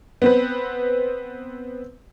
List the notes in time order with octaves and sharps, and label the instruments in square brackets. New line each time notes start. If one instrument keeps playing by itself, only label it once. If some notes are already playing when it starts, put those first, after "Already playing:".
[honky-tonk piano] B3 C4 B4